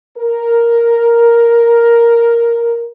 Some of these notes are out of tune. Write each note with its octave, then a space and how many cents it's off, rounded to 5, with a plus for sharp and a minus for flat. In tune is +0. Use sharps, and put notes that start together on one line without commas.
A#4 +5